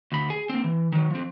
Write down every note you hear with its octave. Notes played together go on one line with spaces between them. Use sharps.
D2 B5
G#4
A#3 C4
E3
D#3 F#3
F3 C4